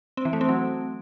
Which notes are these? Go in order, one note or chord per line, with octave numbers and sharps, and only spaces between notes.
C4
E3
A3
C4
F#3